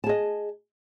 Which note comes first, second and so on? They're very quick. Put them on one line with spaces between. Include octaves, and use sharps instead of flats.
A5 G#4 D#5